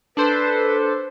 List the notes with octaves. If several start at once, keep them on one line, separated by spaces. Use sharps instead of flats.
D4 A4 B4 C5